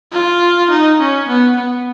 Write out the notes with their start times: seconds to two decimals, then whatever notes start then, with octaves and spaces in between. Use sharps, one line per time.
0.13 F4
0.70 D#4
1.00 C#4
1.28 B3
1.56 B3